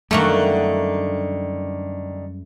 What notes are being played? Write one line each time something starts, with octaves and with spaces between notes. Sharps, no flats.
F#2 D3 D#3 G3 A3 A#3 F#4